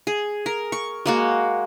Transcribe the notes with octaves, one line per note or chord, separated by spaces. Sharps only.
G#4
A#4
C#6
G#3 A#3 F#4